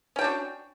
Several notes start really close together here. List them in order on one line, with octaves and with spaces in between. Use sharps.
C#4 G5 D4 F#4